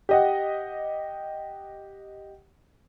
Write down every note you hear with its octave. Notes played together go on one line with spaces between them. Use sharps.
G4 D#5 F#5